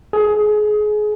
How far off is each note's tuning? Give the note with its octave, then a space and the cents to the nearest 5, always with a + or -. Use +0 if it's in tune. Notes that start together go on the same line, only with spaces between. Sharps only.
G#4 +25